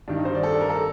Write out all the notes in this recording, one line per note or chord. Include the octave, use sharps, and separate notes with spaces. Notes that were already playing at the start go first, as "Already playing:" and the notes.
G2 D#3 G3 D4
D#4
C5
D5
A4
D5
A#4
A4